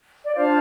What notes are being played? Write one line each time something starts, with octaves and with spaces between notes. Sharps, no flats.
D5
D4 F4 C5 F5